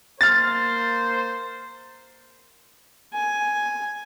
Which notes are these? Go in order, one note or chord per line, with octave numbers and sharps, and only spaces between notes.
A#3 A#4 C5 F6 A6
G#5